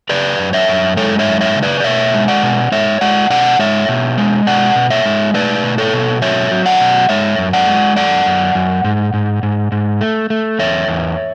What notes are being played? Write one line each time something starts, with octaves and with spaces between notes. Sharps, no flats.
C#3 B4 D5
F#2
C#5 E5
F#2
G#3 A4 C#5
C#5 E5
F#2
C#5 E5
C#3
B4 D5
D5
B2 C#5 E5
G#3
D5 F#5
B2
G#3 C#5 E5
G#3 D5 F#5
B2 D5 F#5
G#3 C#5 E5
B2
G#3
B2 D5 F#5
B2
C#5 E5
G#3
A3 B4 D5
B2
A4 C#5
B2
F#3 C#5 E5
F#3
D5 F#5
B2
G#3 C#5 E5
F#2
D5 F#5
G#3
F#2 D5 F#5
F#2
F#2
G#2
G#2
G#2
G#2
A3
A3
E2 C#5 E5
E2